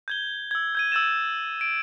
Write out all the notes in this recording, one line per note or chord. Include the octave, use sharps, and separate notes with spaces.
G6 G#6 G7
E6 G#6
G6 G#6 D#7
E6 G6 A6 E7
D7